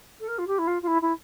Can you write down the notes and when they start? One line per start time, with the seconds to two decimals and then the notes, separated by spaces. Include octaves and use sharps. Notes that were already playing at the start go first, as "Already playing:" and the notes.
0.20 A4
0.27 A#4
0.38 F4
0.47 G4
0.58 E4
0.67 F4
0.82 F4
0.87 E4
1.01 E4